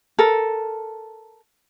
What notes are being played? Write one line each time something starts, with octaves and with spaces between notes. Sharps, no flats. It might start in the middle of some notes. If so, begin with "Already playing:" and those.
A4 A#4